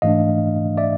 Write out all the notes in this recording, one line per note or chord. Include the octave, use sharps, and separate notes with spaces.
G#2 E3 A3 D4 D#5 F5
D5 E5